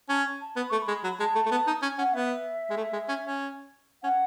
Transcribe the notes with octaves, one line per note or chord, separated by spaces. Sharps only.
C#4 A5
G#5
A5
B3 B5
A3 C#6
B5
G#3
F#3
G#3 A5
A3
A3
B3
D#4
C#4 G#5
C#4 F#5
B3 E5
G#3
A3
G#3
C#4
C#4
C#4 F#5